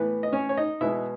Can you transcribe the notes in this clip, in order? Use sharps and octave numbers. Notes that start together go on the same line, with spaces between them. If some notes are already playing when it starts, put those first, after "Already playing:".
Already playing: A2 E3 B3 B4
D#5
C#4 C#5
C#5
D#4 D#5
B2 G#3 B3 E4 E5